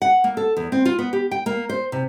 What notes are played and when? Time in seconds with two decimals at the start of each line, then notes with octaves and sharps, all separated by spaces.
0.02 F#5
0.24 A#3
0.37 A4
0.57 E2
0.72 C4
0.85 F4
0.99 B3
1.13 G4
1.31 G5
1.46 A#3
1.69 C5
1.92 C3